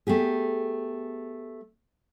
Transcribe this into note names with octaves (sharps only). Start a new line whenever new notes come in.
A3 B3 G4 G#4